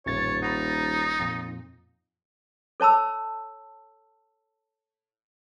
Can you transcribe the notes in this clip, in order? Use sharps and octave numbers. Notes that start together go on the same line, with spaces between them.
D#1 A1 F2 A#2 C#5 A6
D#4 F#5 A#5 B5
F2 A#2
A4 C#5 A5 B5 E6